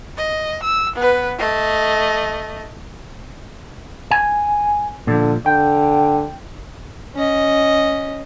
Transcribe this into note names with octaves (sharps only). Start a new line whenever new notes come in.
D#5
E6
B3 B4
A3 D#5
G#5
A#2 D3 F3
D3 G5
C#4 D#5